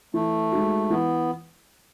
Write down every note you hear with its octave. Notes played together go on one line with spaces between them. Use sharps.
E3 A3
G#3 D#4 F#4
E3 B3